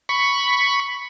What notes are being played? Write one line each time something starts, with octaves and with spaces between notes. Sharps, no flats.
B5 C#6